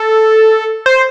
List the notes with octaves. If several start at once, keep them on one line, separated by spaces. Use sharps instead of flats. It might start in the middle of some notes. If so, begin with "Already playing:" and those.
Already playing: A4
C5